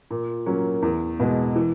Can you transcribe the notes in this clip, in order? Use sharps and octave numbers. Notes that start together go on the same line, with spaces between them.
A#2
F#3 A#3 C#4
E2
B2 G#3
E3